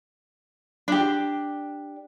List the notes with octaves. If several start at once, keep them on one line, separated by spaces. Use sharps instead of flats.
D4 G4